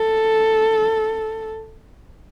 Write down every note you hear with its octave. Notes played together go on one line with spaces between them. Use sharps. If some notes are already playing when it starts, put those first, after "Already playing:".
Already playing: A4